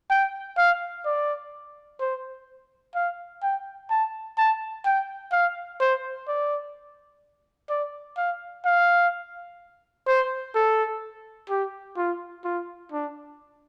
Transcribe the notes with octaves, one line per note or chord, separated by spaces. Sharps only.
G5
F5
D5
C5
F5
G5
A5
A5
G5
F5
C5
D5
D5
F5
F5
C5
A4
G4
F4
F4
D4